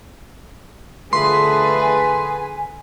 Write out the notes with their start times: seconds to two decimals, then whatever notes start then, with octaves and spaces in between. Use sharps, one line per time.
1.13 D3 A3 F4 G#4 A4 B4 C6
1.82 G#5